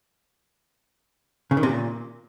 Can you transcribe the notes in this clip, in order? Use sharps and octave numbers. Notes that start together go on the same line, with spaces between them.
C#3
D#3
C3
A#2